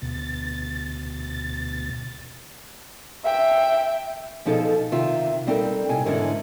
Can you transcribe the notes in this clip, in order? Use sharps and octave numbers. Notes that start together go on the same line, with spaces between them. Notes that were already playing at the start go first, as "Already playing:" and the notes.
D2 B2 A6
E5 G5
B2 F3 D#4 G#4 A4
C3 D#3 F4 E5
G3 C4 D#4 A4 A#4
G#2 C3 E4 G#5
E2 G#2 D3 E3 C#4 A#4